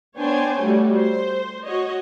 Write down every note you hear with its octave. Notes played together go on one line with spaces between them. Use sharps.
B3 D4 C5 C#5 G5 G#5
G3 A3 F#4
C5
F#4 C#5 D#5